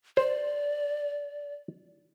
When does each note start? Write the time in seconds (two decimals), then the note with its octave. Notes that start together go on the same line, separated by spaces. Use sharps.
0.17 C5 D5